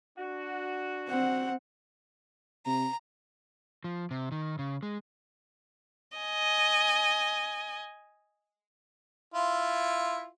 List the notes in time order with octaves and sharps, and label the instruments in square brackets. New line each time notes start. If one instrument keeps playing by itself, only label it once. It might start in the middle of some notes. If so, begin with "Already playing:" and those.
[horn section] D4 F#4
[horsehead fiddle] C4 F#5
[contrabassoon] C3 [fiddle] A#5
[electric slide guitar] F3
C3
D#3
C#3
G#3
[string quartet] D#5 G#5
[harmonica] E4 F4